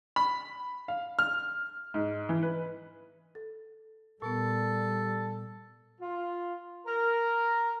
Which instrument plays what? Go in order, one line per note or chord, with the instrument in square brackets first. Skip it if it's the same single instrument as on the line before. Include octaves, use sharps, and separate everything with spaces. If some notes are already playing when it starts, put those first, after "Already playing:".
[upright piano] B5
F5
F6
G#2
E3
B4
[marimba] A4
[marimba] A#2 B3 [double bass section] G3 [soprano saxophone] A4
[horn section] F4
A#4